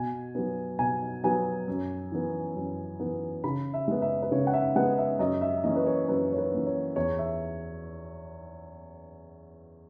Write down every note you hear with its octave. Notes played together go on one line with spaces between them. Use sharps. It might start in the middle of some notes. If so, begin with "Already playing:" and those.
Already playing: B2 G#5
F#3 B3
B2 G#5
F#3 B3 G#5
F#2
E3 B3
F#2
E3 B3
C#3 B5
E5
G#3 B3
E5
B4
C#3 C#5
F#5
E5
G#3 B3 F#5
E5
F#2 D#5
E5
E3 A#3 C#4 D#5
B4
C#5
F#2 B4
C#5
B4
E3 A#3 C#4
C#5
E2 C#5
E5